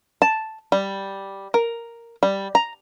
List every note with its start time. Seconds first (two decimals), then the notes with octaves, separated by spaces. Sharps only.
0.22 A5
0.72 G3
1.54 A#4
2.23 G3
2.55 A#5